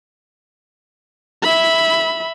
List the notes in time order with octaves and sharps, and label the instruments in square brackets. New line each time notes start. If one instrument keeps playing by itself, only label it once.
[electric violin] E5 B5